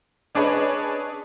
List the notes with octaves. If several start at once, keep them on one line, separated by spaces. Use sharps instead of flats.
C#4 D4 G#4 B4 C#5 D#5